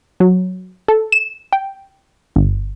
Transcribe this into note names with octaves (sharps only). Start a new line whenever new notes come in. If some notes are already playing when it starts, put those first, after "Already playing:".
F#3
A4
E7
G5
G1